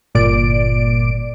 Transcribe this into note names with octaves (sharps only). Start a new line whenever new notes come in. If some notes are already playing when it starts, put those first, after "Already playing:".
G1 A#2 D5 D7